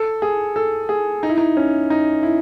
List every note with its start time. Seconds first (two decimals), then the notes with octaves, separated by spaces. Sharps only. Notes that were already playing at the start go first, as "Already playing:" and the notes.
Already playing: A4
0.22 G#4
0.56 A4
0.89 G#4
1.23 D#4
1.29 E4
1.38 D#4
1.57 C#4
1.90 D#4
2.23 E4